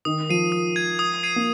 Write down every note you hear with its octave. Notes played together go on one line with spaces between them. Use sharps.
D#3 D#6
F3 C7 D#7
D#6
G#6 D#7
D#6
G#6 C7 D#7
A#3